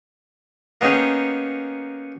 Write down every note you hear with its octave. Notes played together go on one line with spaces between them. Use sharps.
A#3 B3 C#4 D#4 G#4 G5